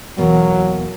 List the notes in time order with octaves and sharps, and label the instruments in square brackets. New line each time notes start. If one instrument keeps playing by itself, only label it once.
[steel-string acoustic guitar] E2 B2 A#3 [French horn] F#3